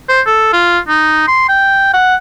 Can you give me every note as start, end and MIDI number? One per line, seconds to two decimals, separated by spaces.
0.09 0.21 72
0.26 0.50 69
0.53 0.79 65
0.88 1.23 63
1.28 1.44 84
1.49 1.90 79
1.94 2.15 78